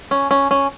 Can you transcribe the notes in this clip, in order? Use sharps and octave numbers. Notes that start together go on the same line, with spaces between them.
C#4
C#4
C#4